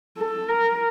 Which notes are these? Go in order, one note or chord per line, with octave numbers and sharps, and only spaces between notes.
A4
A#4